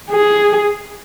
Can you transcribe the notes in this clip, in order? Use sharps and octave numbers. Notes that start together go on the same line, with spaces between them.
G#4